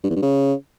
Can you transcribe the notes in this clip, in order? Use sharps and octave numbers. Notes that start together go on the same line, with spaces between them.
G2
E2
G2
C#3